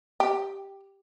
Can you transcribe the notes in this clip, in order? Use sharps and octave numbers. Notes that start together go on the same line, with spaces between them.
G4